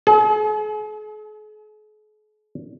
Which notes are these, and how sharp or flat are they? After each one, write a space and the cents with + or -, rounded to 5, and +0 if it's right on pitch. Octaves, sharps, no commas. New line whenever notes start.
G#4 +45